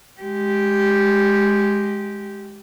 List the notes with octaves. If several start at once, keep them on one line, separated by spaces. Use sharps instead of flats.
G#3 G4